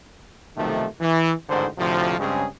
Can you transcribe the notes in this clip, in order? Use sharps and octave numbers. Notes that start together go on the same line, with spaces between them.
B1 C3 D#3 F3 A3
E3
A1 G#2 D3 D#3 C5
D2 A2 C3 F3
G2 C#3 G#3 C4 C#4 G#4